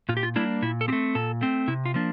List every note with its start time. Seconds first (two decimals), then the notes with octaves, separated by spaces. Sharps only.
0.09 A#2 F4
0.17 G4
0.23 F4
0.36 G3 A#3 D4 E4
0.62 A#2 E4
0.81 A4
0.88 C4 G4
0.93 A3
1.15 A#2 A4
1.41 A3 C4
1.68 C3 E4
1.85 F4
1.94 F3 A#3 D4